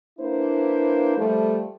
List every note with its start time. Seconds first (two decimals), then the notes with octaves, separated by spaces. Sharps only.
0.19 A#3 D4 E4 B4 C5
1.17 F3 G3 A3